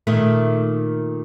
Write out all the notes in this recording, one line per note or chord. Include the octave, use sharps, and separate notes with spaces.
A#2 D#3 A3